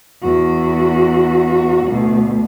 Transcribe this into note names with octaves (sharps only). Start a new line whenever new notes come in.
E2 F#4
D2 B2